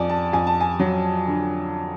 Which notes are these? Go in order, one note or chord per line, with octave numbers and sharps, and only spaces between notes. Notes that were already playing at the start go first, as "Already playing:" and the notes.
Already playing: F2 D5 G#5
A5
F2 G#5
A5
G#5
F#3
D3